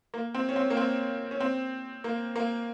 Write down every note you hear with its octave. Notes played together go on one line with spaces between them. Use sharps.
A#3
C4
C#4
C4
A#3
C4
C#4
C4
A#3
A#3